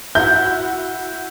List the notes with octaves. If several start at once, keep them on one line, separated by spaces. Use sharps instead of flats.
E4 F#4 G6